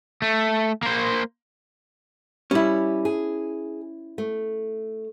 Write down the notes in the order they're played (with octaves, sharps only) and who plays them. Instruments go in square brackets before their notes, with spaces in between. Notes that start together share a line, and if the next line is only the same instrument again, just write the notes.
[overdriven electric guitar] A3
A#3 C5
[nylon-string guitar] G3 [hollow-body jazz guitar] C#4 E4
[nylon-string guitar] G#4
A3